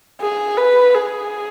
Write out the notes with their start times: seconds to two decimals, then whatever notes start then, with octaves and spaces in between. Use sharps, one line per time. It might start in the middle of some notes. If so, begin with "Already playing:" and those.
0.21 G#4
0.57 B4
0.95 G#4